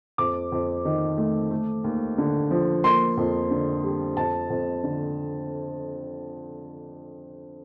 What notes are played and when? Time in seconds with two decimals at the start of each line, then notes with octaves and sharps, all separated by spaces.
0.18 F2 D6
0.52 F2
0.85 D#3
1.18 A3
1.51 A3
1.84 D#2
2.18 D3
2.51 F3
2.84 A#3 C6
3.17 F2
3.51 D3
3.84 G3
4.17 F2 A5
4.50 F2
4.84 D3